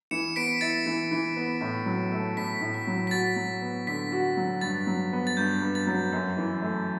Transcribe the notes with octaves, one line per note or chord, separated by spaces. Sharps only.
E3 C#7 E7
B3 B6 D7
E4 A6 C#7
E3
E3
B3
A2
F#3
A3
A2 B6
A2
B6
F#3
B6
F#4 A6
F#3
B3
D3 B6
F#4
F#3
G2 A6
F#3
B3
A6
G2 G6
G2
A6
F#3
F#2
E3
A3